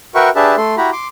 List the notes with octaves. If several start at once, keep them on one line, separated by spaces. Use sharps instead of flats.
F#4 A#4 B4 E5 G5 C#6
D4 G4 G#4 B4 E5 A5
A3 A4 C6
E4 F#4 G4 A#5 B5
C6 D6